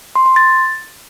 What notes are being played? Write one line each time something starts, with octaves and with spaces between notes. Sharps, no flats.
C6
C6
A6